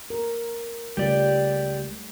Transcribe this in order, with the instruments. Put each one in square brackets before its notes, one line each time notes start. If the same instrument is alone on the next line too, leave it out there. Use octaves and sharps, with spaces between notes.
[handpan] A#4
[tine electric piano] C#2 [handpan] G3 A3 [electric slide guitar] G4 D5